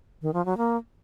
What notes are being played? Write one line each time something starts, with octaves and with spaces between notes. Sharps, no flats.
D#3
F3
F#3
A#3